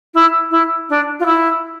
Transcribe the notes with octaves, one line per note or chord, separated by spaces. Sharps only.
E4
E4
D4
F4
E4